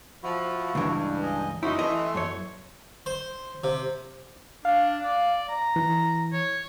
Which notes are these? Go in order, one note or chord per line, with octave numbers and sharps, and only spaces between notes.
F3 E4 F#4
C#2 G2 E3
D#5 G#5
F#2 D#4 E4 C#5 C6
E3 A3 A4 D#5 C6
F#2 C#5
C5
C3
D4 F5
D5
A#5
E3
C#5